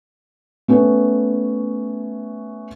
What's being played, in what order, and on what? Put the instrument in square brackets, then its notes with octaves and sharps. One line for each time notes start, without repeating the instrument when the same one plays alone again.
[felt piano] A3 B3 C#4